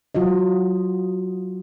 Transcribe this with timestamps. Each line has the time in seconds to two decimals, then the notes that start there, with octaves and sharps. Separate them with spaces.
0.15 F#3 F4 F#4 D#5